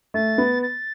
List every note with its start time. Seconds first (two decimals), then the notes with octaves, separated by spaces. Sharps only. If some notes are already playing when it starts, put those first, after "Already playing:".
0.14 A3 A6
0.38 B3
0.62 A6